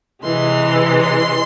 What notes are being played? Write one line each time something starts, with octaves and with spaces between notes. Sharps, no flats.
C3 E3 G#3 C6
C6